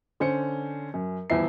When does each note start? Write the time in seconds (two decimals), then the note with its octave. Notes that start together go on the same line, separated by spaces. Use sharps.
0.20 D3 C#4 C5 C#7
0.94 F#2
1.30 D#1 E2 E4 E5 C7